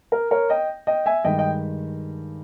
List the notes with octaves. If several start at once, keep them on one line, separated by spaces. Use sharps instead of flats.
A#4
A#4 C#5
D#5 G5
D#5 G5
E5 G#5
G2 D#3 G#3 D#5 G5
D#5 G5